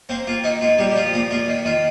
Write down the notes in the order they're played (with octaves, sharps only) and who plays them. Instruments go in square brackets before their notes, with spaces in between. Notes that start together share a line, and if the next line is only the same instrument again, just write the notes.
[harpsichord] A#3 C4 C5
A#3 F4
D#3 D#4
A#3 F4
A#2 G3 G4
G4
F3 F4
A#2 F4
A#3 F4
D#3
D#3 F4